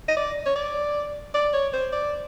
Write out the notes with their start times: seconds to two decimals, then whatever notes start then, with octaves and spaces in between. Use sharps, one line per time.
0.09 D#5
0.17 D5
0.46 C#5
0.56 D5
1.34 D5
1.53 C#5
1.73 C5
1.93 D5